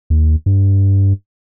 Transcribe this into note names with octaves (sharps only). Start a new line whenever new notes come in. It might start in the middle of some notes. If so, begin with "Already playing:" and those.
D#2
G2